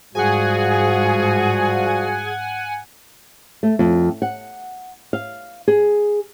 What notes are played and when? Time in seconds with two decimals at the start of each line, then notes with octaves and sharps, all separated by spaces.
0.15 G#2 F3 G3 F#4 G#4 F#5 G#5
3.63 A3
3.79 F2
4.22 F#5
5.13 F5
5.68 G#4